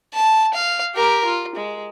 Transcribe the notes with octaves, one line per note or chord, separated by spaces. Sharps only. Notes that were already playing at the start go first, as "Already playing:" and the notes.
A5
F5
G4 A#4
F4
G#3